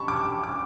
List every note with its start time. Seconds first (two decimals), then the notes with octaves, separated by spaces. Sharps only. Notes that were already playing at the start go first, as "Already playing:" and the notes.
Already playing: A5 B5 C#6
0.08 D6
0.44 D6